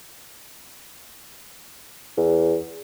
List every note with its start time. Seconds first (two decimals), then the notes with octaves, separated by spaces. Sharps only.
2.18 E2